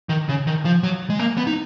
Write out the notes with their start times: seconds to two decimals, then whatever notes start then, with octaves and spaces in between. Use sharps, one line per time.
0.09 D#3
0.29 C#3
0.47 D#3
0.65 F3
0.83 F#3
1.10 G#3
1.19 A#3
1.37 B3
1.47 D#4